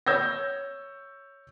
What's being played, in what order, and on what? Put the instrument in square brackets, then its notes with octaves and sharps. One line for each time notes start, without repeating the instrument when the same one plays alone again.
[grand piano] C#5 E6 G6 G#6 A#6